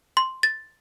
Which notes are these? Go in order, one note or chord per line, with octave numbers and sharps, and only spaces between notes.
C6
A6